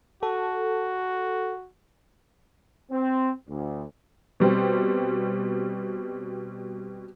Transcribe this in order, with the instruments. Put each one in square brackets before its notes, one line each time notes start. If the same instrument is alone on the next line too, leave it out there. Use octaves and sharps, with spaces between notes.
[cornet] F#4 [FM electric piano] A4
[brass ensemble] C4
D2
[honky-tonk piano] B2 G3 C4